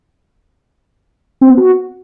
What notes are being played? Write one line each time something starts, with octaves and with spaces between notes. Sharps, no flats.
C4
B3
F#4